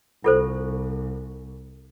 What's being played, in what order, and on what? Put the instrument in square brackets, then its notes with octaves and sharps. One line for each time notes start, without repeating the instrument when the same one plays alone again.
[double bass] C2 [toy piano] F4 A4 C5